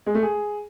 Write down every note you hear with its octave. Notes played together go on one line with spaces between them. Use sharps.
G#3
A3
G#4